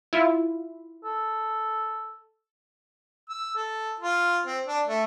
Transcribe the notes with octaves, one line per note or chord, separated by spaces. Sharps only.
E4 F4
A4
E6
A4
F4
C4
D4
A3